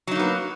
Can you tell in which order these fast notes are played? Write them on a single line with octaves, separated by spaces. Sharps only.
F#3 D#4 A#3 B3